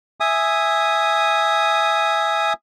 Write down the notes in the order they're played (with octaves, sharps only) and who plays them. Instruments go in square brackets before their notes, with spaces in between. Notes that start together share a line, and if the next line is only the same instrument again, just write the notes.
[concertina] E5 G#5 D#6